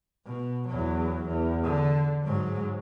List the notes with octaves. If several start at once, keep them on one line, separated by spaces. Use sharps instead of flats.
B2
E2 F#3
E2
D3
G#2 F#3